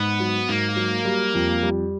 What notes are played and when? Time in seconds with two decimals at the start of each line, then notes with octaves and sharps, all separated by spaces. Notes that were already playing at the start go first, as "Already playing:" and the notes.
Already playing: G#2 B3
0.20 F#3
0.49 G#2 A#3
0.76 F#3
1.05 G3
1.34 F2
1.63 G3